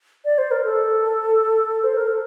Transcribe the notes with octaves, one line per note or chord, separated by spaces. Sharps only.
D5
C5
A#4
A4
C5
A#4
A4